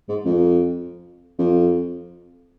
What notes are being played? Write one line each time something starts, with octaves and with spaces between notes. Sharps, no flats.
G#2
F2
F2